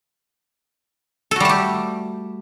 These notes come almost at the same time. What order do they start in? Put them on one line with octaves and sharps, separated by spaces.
A4 F#4 G3 A3 G4